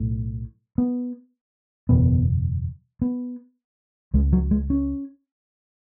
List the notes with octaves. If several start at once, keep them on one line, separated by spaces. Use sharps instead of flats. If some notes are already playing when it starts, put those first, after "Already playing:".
Already playing: B1 A2
B3
F#1 E2 B2 B3
B3
C#2 C#3 G#3
F#3
G#3
C#4